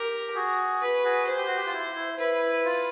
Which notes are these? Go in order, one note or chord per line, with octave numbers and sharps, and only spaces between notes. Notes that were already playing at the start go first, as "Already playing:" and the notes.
Already playing: G4 A#4
F#4 G#4
B4
F#4 G#4
G#4 C5
G4
F#4
G4
F4
E4
E4
E4 B4
F4